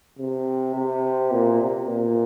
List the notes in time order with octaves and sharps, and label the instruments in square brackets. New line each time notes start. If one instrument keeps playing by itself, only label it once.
[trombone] C3
C3
A#2
C3
A#2